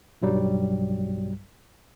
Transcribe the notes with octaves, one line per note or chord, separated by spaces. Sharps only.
B1 G2 F#3 G3